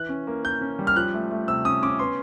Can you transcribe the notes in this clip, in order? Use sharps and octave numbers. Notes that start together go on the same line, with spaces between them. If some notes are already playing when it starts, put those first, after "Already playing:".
Already playing: E3 F#6
C#4
A#3
A#3 G6
C#4
G3
F6
F3 F#6
A3
A3
C3 E6
C#4 D#6
C#4 D6
B3 C6